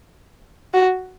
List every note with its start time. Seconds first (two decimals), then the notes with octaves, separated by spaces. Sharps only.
0.74 F#4